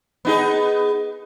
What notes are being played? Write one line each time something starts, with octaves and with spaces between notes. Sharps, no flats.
B3 D#4 G#4